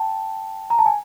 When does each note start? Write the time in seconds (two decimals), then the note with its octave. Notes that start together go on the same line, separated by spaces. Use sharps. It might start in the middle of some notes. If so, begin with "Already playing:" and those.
Already playing: G5 A5
0.70 A#5
0.79 A5
0.86 G#5